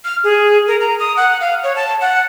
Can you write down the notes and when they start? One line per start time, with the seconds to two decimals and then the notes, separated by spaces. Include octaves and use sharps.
0.05 F6
0.24 G#4
0.67 A#4
0.80 A#5
0.99 D#6
1.17 F#5
1.41 F5
1.63 C#5
1.76 A5
2.01 F#5